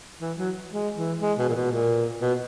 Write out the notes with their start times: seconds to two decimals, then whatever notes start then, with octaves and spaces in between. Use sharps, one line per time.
0.21 E3
0.38 F#3
0.71 G#3
0.96 E3
1.21 G#3
1.38 B2
1.49 A#2
1.55 B2
1.72 A#2
2.21 B2